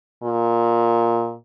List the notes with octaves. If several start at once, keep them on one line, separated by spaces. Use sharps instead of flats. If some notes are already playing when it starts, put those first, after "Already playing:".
A#2